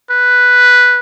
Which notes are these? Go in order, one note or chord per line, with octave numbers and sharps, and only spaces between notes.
B4